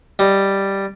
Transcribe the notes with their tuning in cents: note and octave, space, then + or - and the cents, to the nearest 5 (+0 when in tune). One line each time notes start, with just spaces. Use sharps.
G3 +0 D#5 +0